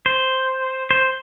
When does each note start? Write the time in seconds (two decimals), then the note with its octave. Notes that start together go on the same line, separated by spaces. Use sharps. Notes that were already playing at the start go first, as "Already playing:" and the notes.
0.06 C5
0.91 C5